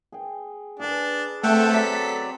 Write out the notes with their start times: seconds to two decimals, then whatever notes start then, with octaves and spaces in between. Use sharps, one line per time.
0.12 G#4 G5
0.79 D4 G#4 B4 G#5
1.43 A3 B3 C4 A4 E5 F#5 G5
1.73 F#3 D5 B6